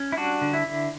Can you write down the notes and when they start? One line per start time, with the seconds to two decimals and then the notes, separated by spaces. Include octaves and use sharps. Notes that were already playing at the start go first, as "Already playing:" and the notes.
Already playing: C#4
0.12 E4
0.17 G3 D4 F#4
0.42 D3
0.53 E4
0.66 D3